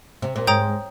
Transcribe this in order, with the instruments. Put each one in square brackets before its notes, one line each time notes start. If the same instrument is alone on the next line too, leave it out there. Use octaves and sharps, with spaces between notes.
[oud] C3
A#2
[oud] G#2 [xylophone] C#5 G5 A#5 D#6 G6